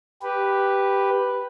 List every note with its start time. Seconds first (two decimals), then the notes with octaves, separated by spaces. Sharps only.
0.22 G4 B4